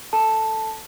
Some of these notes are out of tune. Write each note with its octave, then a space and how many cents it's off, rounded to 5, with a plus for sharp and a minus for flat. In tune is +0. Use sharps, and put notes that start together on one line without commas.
A4 +0 A5 +0